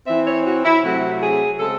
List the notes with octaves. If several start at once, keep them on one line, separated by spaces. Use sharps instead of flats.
E3 C4 E5
C#5
F#4
E4
C3 F#3 A3 C4 F#4
G#4
C#3 G#3 C4 A4